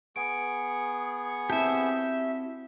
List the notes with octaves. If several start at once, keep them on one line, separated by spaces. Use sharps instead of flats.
B3 G#4 F#5 C#6 D7
C4 E4 F#4 G4 E5 A5